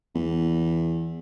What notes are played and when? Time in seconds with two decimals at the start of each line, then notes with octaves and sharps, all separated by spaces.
0.15 E2